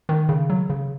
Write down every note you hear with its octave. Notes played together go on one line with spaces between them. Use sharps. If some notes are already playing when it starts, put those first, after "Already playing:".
D#3
C#3
F#3
C#3